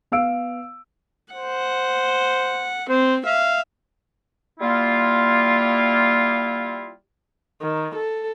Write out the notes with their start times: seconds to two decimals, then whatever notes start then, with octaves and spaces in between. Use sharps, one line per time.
0.12 B3 F5 E6 D7
1.33 C5 F#5
2.90 C4 C5
3.26 E5 F5
4.60 G3 A#3 E4 F4
7.62 D#3
7.95 A4